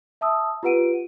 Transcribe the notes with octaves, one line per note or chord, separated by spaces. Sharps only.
E5 A5 D#6 E6
F4 G4 B4 F#5 D7 D#7